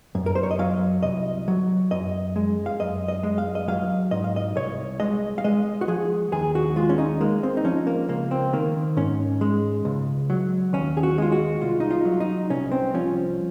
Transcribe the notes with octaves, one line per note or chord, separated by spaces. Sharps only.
F#2
A#4
C5
C#5
D#5
F#3 F5
C2 D#5
F#3
F#2 D#5
G#3
F5
F#2 D#5
D#5
G#3
F5
D#5
F#3 F5
G#2 D#5
F5
D#5
C2 C#5
G#3 D#5
F5
G#3 D#5
F#4
F3 G#4
D#2 G#4
F#4
G#3 F4
C#4
D#4
G#3 A#3
C4
D#4
F3 C#4
A#3
C#2 A#3
C4
D#3 A#3
G#2 C#4
G#3
C#2
F#3
D#2 C#4
G#4
F#4
G#3 F4
F#4
C2 F4
D#4
F4
F#3
D#4
C2 C#4
C4
F3 C#4